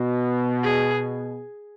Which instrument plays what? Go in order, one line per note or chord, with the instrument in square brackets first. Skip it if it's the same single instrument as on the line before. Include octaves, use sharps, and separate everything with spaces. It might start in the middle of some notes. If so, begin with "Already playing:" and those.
Already playing: [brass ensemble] B2
[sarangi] G#4